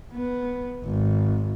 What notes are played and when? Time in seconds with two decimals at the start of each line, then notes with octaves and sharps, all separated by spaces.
0.13 B3
0.84 G#1